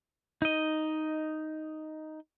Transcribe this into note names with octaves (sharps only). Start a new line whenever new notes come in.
D#4 D#5